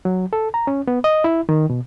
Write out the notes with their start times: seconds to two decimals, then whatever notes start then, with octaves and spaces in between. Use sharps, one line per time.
0.05 F#3
0.33 A4
0.54 A#5
0.67 C#4
0.88 B3
1.04 D#5
1.24 E4
1.49 D#3
1.70 B2